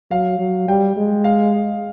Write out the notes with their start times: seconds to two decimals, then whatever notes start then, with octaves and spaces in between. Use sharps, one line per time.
0.10 F#3 F5
0.39 F#3
0.68 G3 G5
0.97 G#3
1.24 F5